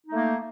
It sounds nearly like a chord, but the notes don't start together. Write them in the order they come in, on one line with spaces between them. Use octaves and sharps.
D#4 A3 A#3